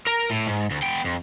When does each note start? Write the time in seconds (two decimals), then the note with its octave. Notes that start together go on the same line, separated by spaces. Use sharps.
0.07 A#4 A#5
0.30 A2
0.47 G#2
0.71 D2
0.82 B3 G5
1.04 F2